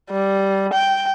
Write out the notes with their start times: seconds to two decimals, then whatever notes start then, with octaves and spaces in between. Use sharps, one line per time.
0.11 G3
0.73 G5